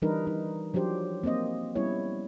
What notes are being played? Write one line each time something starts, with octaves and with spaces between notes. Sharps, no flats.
E3 G3 D4 D#4 A#4 B4
D#4
F3 F#3 D4 G4 C5
A#3 C4 C5 D#5
G3 B3 C#4 E4 C#5